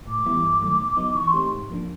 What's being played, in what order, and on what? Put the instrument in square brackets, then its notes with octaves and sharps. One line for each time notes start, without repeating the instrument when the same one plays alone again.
[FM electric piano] A2 [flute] D6
[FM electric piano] E3 G3 B3 E4
G2
D#3 F#3 A3
B2
F#3 B3 D#4
[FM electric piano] E3 [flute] C#6
[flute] C6
[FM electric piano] A3 C4 D#4 G4
G#2
F3 A#3 D4